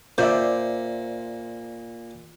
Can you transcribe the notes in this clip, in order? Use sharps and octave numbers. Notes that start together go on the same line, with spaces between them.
A#2 C5 D5 E5